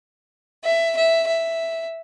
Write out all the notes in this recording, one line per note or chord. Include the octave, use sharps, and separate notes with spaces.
E5
E5
E5